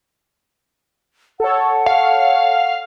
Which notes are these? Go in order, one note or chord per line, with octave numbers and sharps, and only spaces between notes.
A4 C#5 F#5
F5